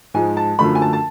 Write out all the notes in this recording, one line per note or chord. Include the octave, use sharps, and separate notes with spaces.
G#2 F3 G#3 G#5
A5
F#2 D3 F3 A3 B5
G#5
A5
A5